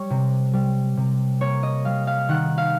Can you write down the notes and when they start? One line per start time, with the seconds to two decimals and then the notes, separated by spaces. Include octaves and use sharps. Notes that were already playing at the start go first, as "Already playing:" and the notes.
Already playing: G3 C#5
0.10 C3
0.53 G3
0.97 C3
1.41 A#3 C#5
1.63 D#5
1.85 G3 F5
2.07 F5
2.29 D#3 F#5
2.58 F5